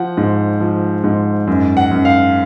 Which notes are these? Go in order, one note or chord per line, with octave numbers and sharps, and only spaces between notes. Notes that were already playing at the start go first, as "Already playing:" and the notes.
Already playing: F3 F#5
G#2
F3
G#2
F#2
F#5
F#2
F5